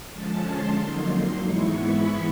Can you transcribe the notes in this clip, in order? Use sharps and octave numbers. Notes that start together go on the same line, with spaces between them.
D3 F3 G#3 C#4 A5
C6
F2 D3 F#3 A#3 D#4
G#2 E3 G#3 B3 E4 C#6
B5